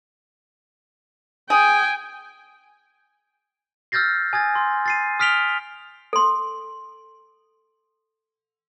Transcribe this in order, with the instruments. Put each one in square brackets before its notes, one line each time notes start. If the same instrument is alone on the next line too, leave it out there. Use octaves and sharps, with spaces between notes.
[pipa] G#4 [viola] G5 G#5
[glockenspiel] E6 F6 G6 A6 A#6 C7
G#5 D#6 G#6 A6
C6
A6 C7 D#7
D#6 F6 B6 D7 F7 G7
[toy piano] A4 C6